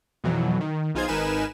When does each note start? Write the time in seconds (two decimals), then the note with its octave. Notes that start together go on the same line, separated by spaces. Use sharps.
0.24 F2 B2 E3 F#3
0.61 D#3
0.95 B1 D#4 F4 G#4 C5 G#6
1.08 G#1 D#4 A#4 B4 G#5 E7